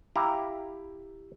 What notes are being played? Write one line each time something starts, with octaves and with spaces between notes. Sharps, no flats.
E4 G4 F5 A#5